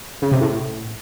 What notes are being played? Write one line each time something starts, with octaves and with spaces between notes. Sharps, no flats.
C#3
C3
A2